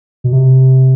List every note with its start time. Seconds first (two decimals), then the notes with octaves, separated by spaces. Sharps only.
0.24 B2
0.33 C3